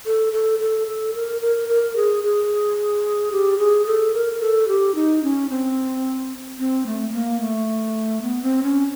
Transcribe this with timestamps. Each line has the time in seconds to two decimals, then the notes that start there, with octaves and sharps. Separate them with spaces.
0.06 A4
0.33 A4
0.60 A4
0.88 A4
1.14 A#4
1.41 A#4
1.69 A#4
1.96 G#4
2.24 G#4
3.32 G4
3.59 G#4
3.86 A4
4.14 A#4
4.41 A4
4.68 G4
4.95 D#4
5.23 C#4
5.50 C4
6.59 C4
6.86 A3
7.10 A3
7.13 A#3
7.40 A3
8.22 B3
8.42 C4
8.63 C#4